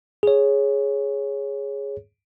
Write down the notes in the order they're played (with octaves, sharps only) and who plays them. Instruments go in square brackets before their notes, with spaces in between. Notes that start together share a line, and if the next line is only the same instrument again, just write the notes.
[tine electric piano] G#4 C#5